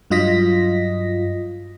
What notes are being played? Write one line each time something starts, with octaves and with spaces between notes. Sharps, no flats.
G2 F#3 F4 D#5 A#6 B6